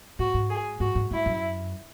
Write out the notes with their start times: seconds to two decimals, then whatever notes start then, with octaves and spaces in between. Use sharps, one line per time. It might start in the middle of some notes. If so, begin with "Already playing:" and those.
0.18 A2 F#4
0.34 G#2
0.49 G#4
0.80 G#2 F#4
0.95 G#2
1.11 G#2 E4
1.26 F#2